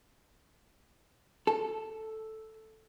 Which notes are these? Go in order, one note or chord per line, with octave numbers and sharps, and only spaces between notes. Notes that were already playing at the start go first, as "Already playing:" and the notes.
A4